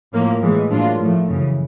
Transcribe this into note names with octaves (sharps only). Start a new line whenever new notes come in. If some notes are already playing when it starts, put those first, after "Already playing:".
A2 F3 A#3
A2 E3 G#3
A2 F#3 A#3 D4 F4
A2 F3 A3
F#2 C#3 E3